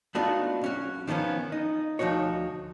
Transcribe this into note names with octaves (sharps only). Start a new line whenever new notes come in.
A3 B3 D4 D#4 F4 F#4
B1 C#4 F#4
D#3 F3 G3 B3 C#4
D#4
D2 F3 D#4 F#4 C#5